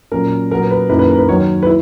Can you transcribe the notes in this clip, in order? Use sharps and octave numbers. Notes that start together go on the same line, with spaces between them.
A#2 F#3 C#4 A#4
A#2 F#3 B3 A#4
B4
F#2 D#3 A#3 E4 B4
B4
A#4
B4
D#2 D#3 F#3 C#5
B4
E4